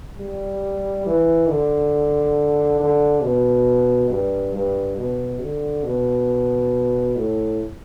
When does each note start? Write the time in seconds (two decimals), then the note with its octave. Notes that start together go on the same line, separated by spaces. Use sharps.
0.18 G3
1.06 E3
1.49 D3
2.80 D3
3.23 B2
4.10 G2
4.54 G2
4.97 B2
5.42 D3
5.84 B2
7.16 A2